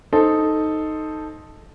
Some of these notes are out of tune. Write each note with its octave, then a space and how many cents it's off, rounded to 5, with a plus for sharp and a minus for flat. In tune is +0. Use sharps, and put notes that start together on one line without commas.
D#4 +0 A4 +0 C5 +5